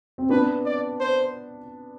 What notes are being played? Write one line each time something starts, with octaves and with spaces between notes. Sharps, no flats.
C4
B3 D4 B4
D5
C5